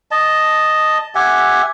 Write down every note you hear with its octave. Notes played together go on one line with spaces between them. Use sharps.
D#5 A5
G4 E5 F#5 G#5